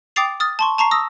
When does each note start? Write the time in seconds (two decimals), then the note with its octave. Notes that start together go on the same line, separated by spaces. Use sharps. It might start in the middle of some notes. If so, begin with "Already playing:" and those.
0.16 G5 D6 D#6 A6 C7 F7
0.40 D#6 F6 A6
0.59 A5 C6 C#6
0.78 A5 A#5 C#6 C7
0.91 D#6 E6 A#6